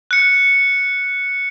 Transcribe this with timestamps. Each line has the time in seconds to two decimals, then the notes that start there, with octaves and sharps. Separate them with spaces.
0.11 F#6 C#7